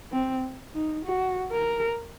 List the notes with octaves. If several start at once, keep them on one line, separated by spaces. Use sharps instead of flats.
C4
D#4
F#4
A#4